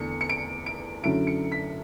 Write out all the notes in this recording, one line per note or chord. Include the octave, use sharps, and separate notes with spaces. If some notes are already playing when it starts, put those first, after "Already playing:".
Already playing: E2 D3 A3 C#7
C#7
D7
D7
F#2 D3 F#3 C#4 E4 D7
C#7
B6